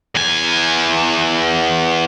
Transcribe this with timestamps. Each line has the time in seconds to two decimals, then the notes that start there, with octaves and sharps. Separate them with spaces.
0.15 E2 G#5